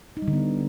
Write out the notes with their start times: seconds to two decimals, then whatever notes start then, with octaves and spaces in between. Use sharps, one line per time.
0.17 D#4
0.22 G3
0.28 D3
0.33 B3